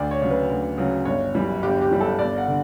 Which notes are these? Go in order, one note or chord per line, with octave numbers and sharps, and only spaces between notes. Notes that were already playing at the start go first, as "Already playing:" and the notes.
Already playing: D2 D5
C#5
C#3 F#3 C#5
B4
D2
C#3 F#3
G1 C#5
F#2 E3 G3
G1 G4
G4
F#2 E3 G3
A4
G1 D5
F#5
D3